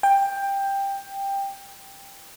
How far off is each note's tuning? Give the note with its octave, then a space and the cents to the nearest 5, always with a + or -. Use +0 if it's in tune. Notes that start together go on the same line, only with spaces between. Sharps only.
G5 +10